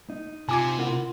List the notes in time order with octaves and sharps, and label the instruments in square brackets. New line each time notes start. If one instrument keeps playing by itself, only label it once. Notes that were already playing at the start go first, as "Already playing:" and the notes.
[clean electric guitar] D#4
[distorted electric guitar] C3 [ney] F4 [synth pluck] G#5 D6 G#6
[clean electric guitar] E4 A#4 F#5